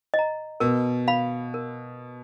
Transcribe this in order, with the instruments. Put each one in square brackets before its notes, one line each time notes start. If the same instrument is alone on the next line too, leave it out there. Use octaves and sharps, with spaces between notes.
[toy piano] D#5
A#5
[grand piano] B2 [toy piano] A#4
[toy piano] F5 B5
A#4